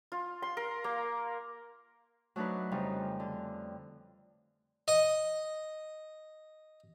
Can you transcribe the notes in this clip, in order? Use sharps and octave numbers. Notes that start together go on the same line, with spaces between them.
F4
C6
A#4
A#3
F#3 A3 D4 D#4 B4
F2 C#3 F3 G3 D#4
D3
D#5 D#6